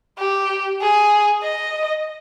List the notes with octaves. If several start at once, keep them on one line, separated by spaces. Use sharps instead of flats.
G4
G#4
D#5